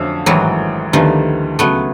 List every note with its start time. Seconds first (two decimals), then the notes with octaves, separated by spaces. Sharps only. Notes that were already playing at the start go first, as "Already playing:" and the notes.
Already playing: F2 D3 F3 F#3 A3 C#4
0.26 A1 G#2 D#3 E3 F#3
0.93 D2 D3 D#3 F3 G3 B3 E4
1.59 C#2 C#3 F#3 A3 B3